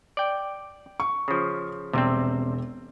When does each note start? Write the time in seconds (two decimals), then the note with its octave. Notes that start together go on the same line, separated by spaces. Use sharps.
0.17 D5 G5
1.00 C#6
1.28 C#3 F3
1.93 E1 C3 G3 C4 E6